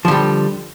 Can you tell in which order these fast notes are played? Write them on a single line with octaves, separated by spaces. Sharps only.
F3 D3 G3